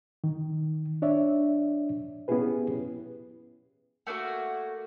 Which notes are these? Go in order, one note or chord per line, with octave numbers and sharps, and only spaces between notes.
D#3
D4 C#5 D5 E5
B3 C#4 E4 G4 G#4 B4
A3 A#3 D#4 F#4